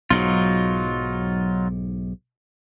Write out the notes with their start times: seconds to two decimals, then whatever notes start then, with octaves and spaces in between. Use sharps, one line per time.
0.10 B1 G#2 F#3 D#4 F4